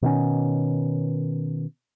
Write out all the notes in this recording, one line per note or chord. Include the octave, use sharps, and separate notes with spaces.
B2 D#3 C4 C#4